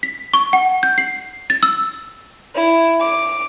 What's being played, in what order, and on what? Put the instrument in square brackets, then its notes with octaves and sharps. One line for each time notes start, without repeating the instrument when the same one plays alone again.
[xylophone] B6
C#6
F#5
G6
C7
A6
E6
[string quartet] E4
D6